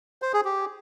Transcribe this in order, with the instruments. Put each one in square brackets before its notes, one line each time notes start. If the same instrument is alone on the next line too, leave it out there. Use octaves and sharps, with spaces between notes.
[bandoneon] C5
G#4
G4